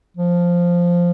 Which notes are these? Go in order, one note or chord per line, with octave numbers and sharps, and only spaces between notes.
F3